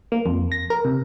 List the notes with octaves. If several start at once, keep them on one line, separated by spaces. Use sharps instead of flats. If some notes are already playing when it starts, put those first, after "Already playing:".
A#3
F2
A#6
A#4
C3